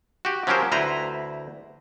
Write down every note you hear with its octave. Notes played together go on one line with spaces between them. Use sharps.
F#4 G4
F3 F#3 C#4 G4 A#4 C5
D2 E4 B4 C5 A#5